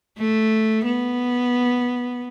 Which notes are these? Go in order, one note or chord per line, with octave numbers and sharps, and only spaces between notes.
A3
B3